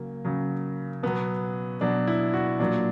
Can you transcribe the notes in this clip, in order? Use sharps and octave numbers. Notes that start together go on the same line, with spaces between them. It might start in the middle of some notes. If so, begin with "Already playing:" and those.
Already playing: C#3 F#3 A#3
C#3 F#3
B2 F#3 B3
B2 F#3 D4
E4
F#4
A#2 F#3 D4